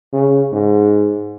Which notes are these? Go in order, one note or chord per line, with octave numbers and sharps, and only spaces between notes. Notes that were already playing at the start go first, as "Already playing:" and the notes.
C#3
G#2